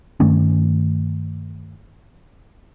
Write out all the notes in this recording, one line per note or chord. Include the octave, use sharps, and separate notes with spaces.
G2 D#3 A3 C#4